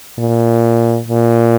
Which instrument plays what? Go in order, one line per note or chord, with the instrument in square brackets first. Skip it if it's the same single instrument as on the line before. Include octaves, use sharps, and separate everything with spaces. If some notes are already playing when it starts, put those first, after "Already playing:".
[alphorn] A#2
A#2